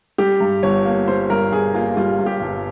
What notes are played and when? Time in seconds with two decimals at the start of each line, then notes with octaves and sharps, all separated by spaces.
0.18 G3 G4
0.40 G2
0.63 G1 C#5
0.85 A#3
1.08 G3 C5
1.30 G2 A#4
1.52 G1 G#4
1.74 A#3 F4
1.97 G3 F4
2.19 G2
2.26 G4
2.42 G1